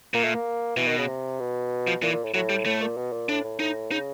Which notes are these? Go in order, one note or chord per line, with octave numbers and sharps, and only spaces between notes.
A#2 A#3
A3
A#3
B2 E3
D#3
C#3
C3
B2
F3
A#2 E3
A#2
A2
A2 F#3
G3
A2 A3
A#2
B2
A#2
A2 D4
A2
A2 D#4
C#3 D#4